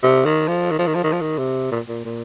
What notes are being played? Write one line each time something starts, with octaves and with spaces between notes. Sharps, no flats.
C3
D#3
F3
D#3
F3
D#3
F3
D#3
F3
D#3
C3
A#2
A#2
A#2